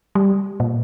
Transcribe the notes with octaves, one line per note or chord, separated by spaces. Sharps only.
G3
A#2